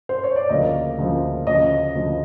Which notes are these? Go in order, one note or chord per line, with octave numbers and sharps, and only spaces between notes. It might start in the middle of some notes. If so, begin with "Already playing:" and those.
C5
C#5
D5
D2 C#3 F3 A#3 D#5
D2 C#3 F3 A#3
D2 C#3 F3 D#5
D2 C#3 F3